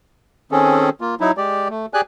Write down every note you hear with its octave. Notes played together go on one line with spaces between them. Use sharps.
D#3 C4 C#4 G#4 A4
A#3 F4
F#3 D#4 E4
G#3 G4 D5
A3
G4 G#4 D5 G#5 F#6